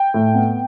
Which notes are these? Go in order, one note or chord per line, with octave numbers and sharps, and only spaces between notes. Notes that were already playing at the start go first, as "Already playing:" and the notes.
Already playing: G5
A2
B3